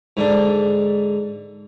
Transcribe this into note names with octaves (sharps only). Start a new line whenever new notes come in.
G#2 D3 D4